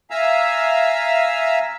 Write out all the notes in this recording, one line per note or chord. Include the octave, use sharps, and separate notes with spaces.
E5 F5 G#5 A#5 E6